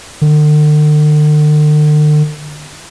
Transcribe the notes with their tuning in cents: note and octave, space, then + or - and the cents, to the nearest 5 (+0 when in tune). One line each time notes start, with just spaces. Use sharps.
D3 +45